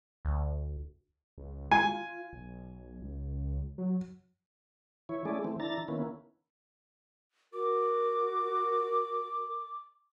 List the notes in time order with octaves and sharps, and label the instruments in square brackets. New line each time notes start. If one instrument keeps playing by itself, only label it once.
[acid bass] D2
[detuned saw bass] C#2
[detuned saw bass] G#3 [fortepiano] G#5
[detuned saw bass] F4
B1
C#2
F#3
[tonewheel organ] E3 E4 C#5
G#3 A3 C#4 E4 G#4 D5
E3 A3 C4
E3 D4 E4 A#5 A6
D#3 A#3 B3 C#4 E4
[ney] F#4 [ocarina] A#4 [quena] D6